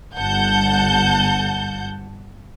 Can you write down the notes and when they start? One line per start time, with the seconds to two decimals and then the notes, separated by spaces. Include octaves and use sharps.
0.15 G1 F#5 A5 G6